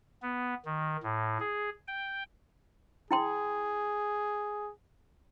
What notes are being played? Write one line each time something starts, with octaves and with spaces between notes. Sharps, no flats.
B3
D#3
A2
G#4
G5
E4 G#4 G5 C6